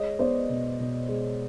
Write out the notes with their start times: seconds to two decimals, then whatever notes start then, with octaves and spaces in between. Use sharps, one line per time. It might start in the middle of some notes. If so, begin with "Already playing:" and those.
Already playing: G#3 C#5 D#5
0.19 B3 C5 D5
0.49 B2
0.79 B2
1.09 G#3